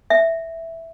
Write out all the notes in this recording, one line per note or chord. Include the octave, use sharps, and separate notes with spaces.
E5